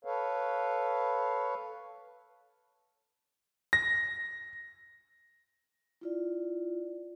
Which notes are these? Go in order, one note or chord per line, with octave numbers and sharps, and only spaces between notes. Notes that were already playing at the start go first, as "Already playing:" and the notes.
A4 B4 C#5 F5
A#6
E4 F4 D5